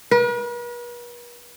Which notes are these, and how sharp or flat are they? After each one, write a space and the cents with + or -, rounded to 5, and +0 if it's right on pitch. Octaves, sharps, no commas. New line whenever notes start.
B4 -45